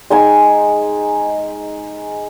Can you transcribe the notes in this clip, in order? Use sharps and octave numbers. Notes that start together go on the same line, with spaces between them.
G#3 D#4 G#5